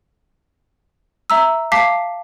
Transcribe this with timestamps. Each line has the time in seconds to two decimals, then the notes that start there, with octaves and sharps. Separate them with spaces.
1.30 E5 A#5 E6
1.72 F5 A5 D6 B6 C7